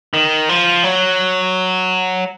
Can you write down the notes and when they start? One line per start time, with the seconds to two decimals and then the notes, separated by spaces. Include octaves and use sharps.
0.14 D#3
0.49 F3
0.84 F#3